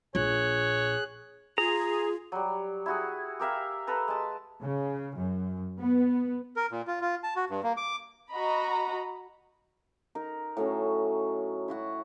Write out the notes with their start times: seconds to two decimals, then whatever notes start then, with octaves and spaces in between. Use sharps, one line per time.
0.15 A#1 F4 G#4 C#5 F#6
1.58 F4 G#4 A#5
2.32 F#3 G3
2.86 E4 F#4 G#4
3.40 G4 A#4 E5 F5
3.87 A4 B4 A#5
4.08 G#3 A5
4.62 C#3
5.16 F#2
5.80 B3
6.56 A#4
6.72 A#2
6.87 F4
7.01 F4
7.23 A5
7.36 F#4
7.50 G2
7.63 A#3
7.77 D6
8.31 F#4 D#5 A#5 B5
10.15 D#4 A#4
10.57 A2 F#3 C#4
11.68 E4 F#4 F#5